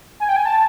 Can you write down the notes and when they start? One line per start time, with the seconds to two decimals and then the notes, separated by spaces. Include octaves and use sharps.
0.20 G#5
0.29 G5
0.36 G#5
0.45 A5